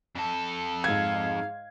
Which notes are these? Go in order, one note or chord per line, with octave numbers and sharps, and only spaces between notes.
F2 A4
G#2 F5 G#6